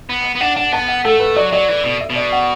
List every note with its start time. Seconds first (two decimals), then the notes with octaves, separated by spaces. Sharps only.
0.09 B3
0.35 B3
0.41 D4 F#5
0.57 D4 F#5
0.72 B3 A5
0.88 F#5
1.05 A3 A4
1.20 B4
1.36 F#3 D5
1.53 F#3 D5
1.69 E3
1.84 B2
2.01 E5
2.10 B2
2.16 D5
2.32 F#5